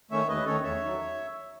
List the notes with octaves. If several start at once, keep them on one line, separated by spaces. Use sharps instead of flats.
D#3 A3 C#4 C#5 E5
D#2 B4 D#5
D#3 A3 C#4 A4 C#5
E2 C#5 E5
D#3 F#3